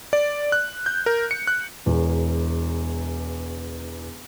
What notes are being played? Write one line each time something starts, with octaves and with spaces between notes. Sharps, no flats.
D5
F#6
G6
A#4
C#7
F#6
E1 E2